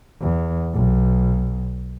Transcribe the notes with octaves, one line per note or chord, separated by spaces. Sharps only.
E2
B1